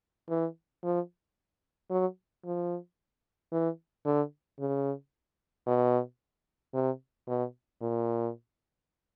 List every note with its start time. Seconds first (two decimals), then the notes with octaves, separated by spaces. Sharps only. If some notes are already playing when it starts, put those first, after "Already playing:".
0.29 E3
0.83 F3
1.90 F#3
2.45 F3
3.52 E3
4.05 D3
4.59 C#3
5.67 B2
6.74 C3
7.27 B2
7.81 A#2